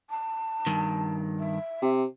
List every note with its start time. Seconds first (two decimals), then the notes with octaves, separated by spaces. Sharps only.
0.10 A5
0.67 G2 D#3
1.39 E5
1.82 C3